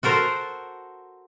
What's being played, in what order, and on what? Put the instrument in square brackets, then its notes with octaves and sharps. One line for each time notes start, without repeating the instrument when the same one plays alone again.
[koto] F#4 A4 A#4 C5